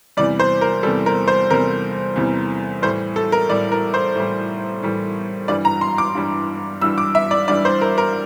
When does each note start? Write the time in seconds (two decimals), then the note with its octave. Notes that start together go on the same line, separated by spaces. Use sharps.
0.17 E2 C3 E3 G3 D5
0.39 C5
0.61 A#4
0.83 E2 C3 E3 G3 A4
1.06 A#4
1.28 C5
1.50 E2 C3 E3 G3 A#4
2.16 E2 C3 E3 G3
2.82 A2 E3 G3 C5
3.16 A4
3.32 A#4
3.49 A2 E3 G3 D5
3.72 A#4
3.94 C5
4.15 A2 E3 G3
4.83 A2 E3 G3
5.48 G2 E3 G3 D5
5.65 A#5
5.81 C6
5.98 D6
6.15 G2 E3 G3
6.82 G2 E3 G3 E6
6.98 D6
7.15 E5
7.31 D5
7.48 G2 E3 G3 D5
7.65 C5
7.81 A#4
7.98 A#4